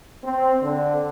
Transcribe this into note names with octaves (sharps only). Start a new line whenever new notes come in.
C4
D3